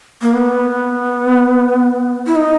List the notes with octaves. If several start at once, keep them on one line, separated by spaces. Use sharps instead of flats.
A#3
B3
E4
D#4